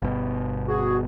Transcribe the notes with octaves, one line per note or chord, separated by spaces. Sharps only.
G1 B2
F#4 G#4